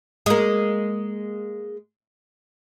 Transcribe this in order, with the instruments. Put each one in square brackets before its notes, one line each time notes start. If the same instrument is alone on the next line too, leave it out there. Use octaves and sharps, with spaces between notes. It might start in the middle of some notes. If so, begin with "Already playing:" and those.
[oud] G#3 A#3